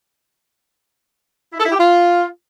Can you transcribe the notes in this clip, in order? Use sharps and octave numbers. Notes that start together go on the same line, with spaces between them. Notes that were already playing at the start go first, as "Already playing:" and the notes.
E4
A4
E4
G4
F4